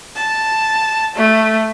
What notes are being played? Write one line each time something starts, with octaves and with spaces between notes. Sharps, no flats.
A5
A3